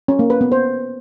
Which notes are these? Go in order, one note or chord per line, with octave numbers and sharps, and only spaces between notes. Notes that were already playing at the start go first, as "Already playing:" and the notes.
C#4
A#3
B4
B3
C5